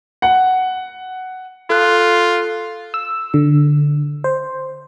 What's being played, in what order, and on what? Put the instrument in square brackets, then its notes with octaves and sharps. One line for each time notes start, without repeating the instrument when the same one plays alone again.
[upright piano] F#5
[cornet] F4 [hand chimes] A4 F#6
[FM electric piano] E6
D3
C5